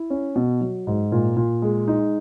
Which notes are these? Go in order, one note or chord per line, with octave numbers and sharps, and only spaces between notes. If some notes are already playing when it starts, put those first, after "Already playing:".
Already playing: E4
C#4
B2
F#3
G#2
A#2
A#2
G#3
D#4